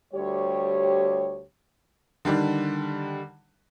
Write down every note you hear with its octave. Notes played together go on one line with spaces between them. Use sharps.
D2 G3 G4 C#5
D3 D#3 G3 D4